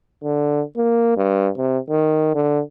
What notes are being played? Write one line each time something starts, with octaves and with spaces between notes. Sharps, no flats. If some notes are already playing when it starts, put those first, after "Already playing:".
D3
A#3
G2
C3
D#3
D3